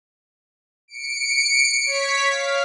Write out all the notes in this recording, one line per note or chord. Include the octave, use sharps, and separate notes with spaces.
C#7 D7
C#5 B6
F5